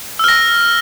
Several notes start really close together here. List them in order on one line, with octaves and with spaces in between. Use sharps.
E6 F6 A#6